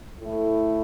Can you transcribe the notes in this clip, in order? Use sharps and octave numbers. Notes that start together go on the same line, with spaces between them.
A2 A3 E4